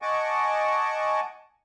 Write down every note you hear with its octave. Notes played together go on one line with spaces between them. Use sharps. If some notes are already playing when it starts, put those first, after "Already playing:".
D#5 F#5 G#5 A5 C#6 D6